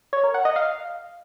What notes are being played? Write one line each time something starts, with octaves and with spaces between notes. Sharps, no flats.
C#5
A#4
F#5
D#5
F5